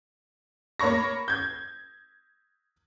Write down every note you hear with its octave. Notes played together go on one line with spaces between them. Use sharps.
A#3 C#5 B5 C#6 A#6
G6 G#6